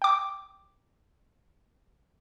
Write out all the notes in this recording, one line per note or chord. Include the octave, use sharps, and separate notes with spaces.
G5 D6